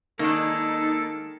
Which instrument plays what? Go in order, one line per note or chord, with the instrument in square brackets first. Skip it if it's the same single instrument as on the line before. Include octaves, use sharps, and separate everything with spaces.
[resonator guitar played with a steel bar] D#3 G#3 [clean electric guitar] A#3 D4 [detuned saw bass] D#4 [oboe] A4